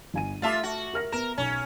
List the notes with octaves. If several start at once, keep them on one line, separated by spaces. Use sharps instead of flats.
G1 G#5 D#7
A3 F4 E5 A5 D6
F#4
A#4 F6 A#6
B3 A#4 E7
B1 C#4